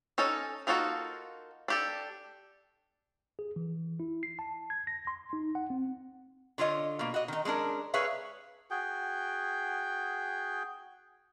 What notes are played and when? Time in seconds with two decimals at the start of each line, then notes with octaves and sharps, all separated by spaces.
0.18 C#4 D#4 A4 D#5
0.67 A#3 D#4 F4 F#4 A4
1.68 D4 G4 A4
3.39 G#4
3.56 E3
4.00 E4
4.23 C7
4.39 A5
4.70 G#6
4.87 A#6
5.07 C6
5.33 D#4
5.55 F#5
5.70 C4
6.58 D3 F4 C#5 D#5
6.99 B2 A#3
7.14 F#4 D#5
7.28 D#3 D#4
7.45 G#3 C#4 D4 A#4
7.94 G#4 B4 C#5 E5 F5
8.71 F#4 G#4 G5